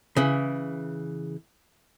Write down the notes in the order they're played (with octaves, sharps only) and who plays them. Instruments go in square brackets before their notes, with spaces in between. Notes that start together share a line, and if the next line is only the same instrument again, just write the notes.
[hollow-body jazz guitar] C#3 E3